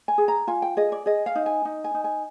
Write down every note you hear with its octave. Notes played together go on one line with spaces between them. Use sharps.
G#5
G#4
A#5
F4 G#5
G5
G#4 D#5
D5
G#4 D#5
F5
D#4
G#5
D#4
G#5
D#4
G#5